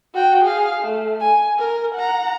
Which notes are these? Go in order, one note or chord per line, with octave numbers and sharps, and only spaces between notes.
F#4 G5
G#4 F5
A3
G#5
A#4
F#5 A#5